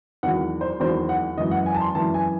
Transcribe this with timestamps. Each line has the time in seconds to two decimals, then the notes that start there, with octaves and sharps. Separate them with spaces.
0.23 E2 D#3 F#3 F#5
0.61 C5
0.80 E2 D#3 F#3 C5
1.09 F#5
1.37 F#2 E3 D#5
1.51 F#5
1.66 G#5
1.75 A5
1.81 C6
1.95 F#2 E3 A5
2.14 G#5